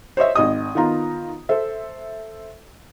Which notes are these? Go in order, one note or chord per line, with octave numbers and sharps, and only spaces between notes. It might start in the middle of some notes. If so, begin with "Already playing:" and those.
C5 C#5 D#5 E5
G#1 D#5 D#6
D#3 B3 F4 A#5
A4 C5 E5